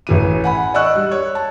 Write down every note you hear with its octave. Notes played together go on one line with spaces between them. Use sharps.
A1 E3 D#7
F#5 G#5 B5
D5 D#5 C#6 E6 F#6
G3
C#5
A5